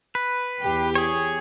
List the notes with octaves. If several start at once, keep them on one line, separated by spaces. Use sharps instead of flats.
B4
E2 G4 C7
G#4 C#5